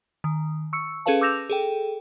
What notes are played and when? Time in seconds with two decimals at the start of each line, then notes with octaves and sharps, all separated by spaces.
0.24 D#3
0.73 C#6 E6 C#7
1.06 C#4 G#4 A4 B4 F5 A5
1.21 D6 E6 G6 A#6 E7 F7
1.50 G#4 A4 G5